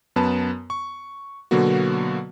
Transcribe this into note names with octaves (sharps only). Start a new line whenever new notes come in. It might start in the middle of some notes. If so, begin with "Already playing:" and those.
F#2 B3 B4 A5
C#6
B2 D3 F#3 A#3 B3 F#4